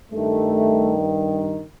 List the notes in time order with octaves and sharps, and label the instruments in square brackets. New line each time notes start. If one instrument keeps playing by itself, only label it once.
[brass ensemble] G2 D#3 G3 A3